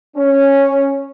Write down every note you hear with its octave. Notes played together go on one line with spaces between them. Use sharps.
C#4